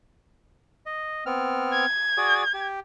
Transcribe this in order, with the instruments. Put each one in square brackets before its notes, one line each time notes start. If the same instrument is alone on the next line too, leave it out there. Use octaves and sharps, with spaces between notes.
[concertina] D#5
B3 C4 F6
[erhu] G#6
[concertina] F#4 G#4 D5
G4